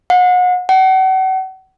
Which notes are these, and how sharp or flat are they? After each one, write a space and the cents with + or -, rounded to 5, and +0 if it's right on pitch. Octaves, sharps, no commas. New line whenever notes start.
F#5 -35
F#5 +40